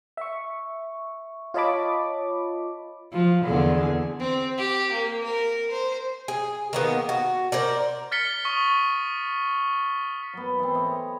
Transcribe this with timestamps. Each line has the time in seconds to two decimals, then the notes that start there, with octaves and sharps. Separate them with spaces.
0.17 E5 C#6
1.54 F4 C#5 D#5 A5 B5 D6
3.13 F3
3.45 E2 D3 G#4
4.19 C4
4.58 G4
4.92 A#3
5.23 A#4
5.71 C5
6.28 G#4
6.73 D#3 A#3 B3
7.09 F#4
7.52 A#4 C5 D5
8.12 F6 A6 B6 C#7 G7
8.45 C#6 D#6
10.33 F#3 B3
10.59 E3 C4
10.74 A4 C#5 D#5